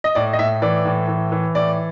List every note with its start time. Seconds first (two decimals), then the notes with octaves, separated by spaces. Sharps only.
0.04 D#5
0.15 A2 D5
0.33 D#5
0.39 A2 E5
0.62 E3 D5
0.85 A2
1.08 E3
1.32 E3
1.55 A2 D5